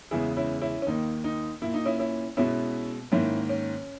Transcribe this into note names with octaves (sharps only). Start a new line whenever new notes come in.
E2 C#3 G#3 B3 E4 G#4
C#4 E4
C#4 E4
C#4
D#2 D#3 A#3 D#4
D#4
A#2 A#3 E4
D#4
C#4 E4
C#4 E4
B2 G#3 B3 C#4 E4
G#2 D#3 A#3 C#4 E4
C#4